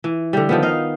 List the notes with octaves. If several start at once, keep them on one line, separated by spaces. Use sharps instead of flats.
E3
D3 G3
D#3 F3 B3
D#4 D#5 F5